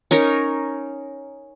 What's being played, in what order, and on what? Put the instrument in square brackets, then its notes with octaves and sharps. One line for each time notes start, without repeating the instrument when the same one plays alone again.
[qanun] C#4 D#4 A#4 C#5